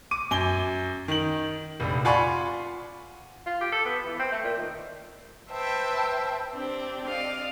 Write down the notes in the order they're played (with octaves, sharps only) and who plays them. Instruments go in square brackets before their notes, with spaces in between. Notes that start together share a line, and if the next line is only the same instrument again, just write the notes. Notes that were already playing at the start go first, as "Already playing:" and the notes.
[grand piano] D6 D#7
F#2 G#5 G7
D#3 F#7
F1 A#1
F4 D5 F#5 G#5 B5 C#6
[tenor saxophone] F4
G4
A4
B3
E3
C4
A3
A#2
D#3
[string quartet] B4 C5 E5 G5 A5
C4 D4 G4
D5 D#5 F5